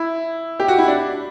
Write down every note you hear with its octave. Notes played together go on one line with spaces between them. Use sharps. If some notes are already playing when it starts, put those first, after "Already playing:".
Already playing: E4
G4
F#4
E4
D4